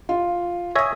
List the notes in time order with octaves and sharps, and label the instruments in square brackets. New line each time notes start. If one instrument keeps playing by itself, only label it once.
[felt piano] F4
[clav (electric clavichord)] C#5 E5 G#5 [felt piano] D#6 A#6